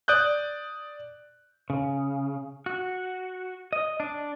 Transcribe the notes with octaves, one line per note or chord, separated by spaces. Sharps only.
D5 D#6 F#6 G6
C#3
F#4
D#5
D4